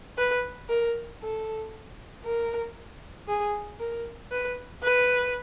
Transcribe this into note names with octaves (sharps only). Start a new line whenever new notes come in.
B4
A#4
A4
A#4
G#4
A#4
B4
B4